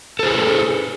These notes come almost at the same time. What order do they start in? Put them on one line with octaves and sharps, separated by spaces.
A4 C5 G#4